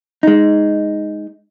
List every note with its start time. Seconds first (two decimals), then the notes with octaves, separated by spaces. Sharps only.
0.23 G#3 D#4